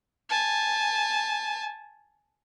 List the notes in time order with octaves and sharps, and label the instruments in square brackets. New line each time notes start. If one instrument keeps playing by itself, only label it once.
[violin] G#5 A5